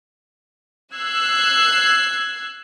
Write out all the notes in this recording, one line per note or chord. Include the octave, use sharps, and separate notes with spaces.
E6 F#6 G#6 C7